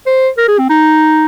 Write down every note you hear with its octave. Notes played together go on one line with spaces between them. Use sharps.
C5
A#4
G#4
C4
D#4